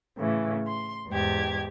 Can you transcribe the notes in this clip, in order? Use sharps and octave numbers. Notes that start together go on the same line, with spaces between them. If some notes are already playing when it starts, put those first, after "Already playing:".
A2 C#3 E3
C6
E2 G#2 G4 G#6